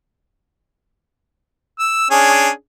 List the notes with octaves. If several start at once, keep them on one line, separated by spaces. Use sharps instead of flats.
E6
C#4 D4 G#4